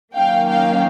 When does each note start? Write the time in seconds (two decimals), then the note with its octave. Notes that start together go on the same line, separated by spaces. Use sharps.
0.15 D#3 F#3 A#3 C#4 F5 G5
0.49 F5 G5